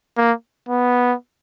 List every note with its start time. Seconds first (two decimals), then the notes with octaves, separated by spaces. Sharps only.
0.17 A#3
0.68 B3